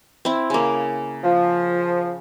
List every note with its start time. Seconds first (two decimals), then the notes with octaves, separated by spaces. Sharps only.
0.25 C4 E4
0.50 C#3 A#3
1.24 F3